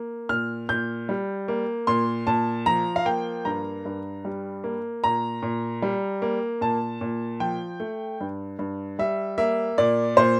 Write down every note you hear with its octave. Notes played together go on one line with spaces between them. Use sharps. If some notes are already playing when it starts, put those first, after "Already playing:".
Already playing: A#3
A#2 F6
A#2 G6
G3
A#3
A#2 C6
A#2 A5
F3 A#5
F5
A#3 G5
G2 A#5
G2
G3
A#3
A#2 A#5
A#2
G3
A#3
A#2 A5
A#2
F3 G5
A3
G2
G2
G3 E5
A#3 E5
A#2 D5
A#2 C5